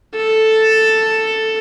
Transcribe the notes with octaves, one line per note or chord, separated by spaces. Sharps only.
A4